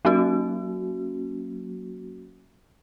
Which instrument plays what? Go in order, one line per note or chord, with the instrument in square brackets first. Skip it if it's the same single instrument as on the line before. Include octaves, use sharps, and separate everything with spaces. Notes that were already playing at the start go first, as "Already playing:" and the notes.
[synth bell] F#3 A#3 C#4 F#4